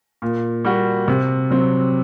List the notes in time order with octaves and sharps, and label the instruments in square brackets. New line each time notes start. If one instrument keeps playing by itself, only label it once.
[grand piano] A#2
G3 A#3 F#4
C3
F#3 C4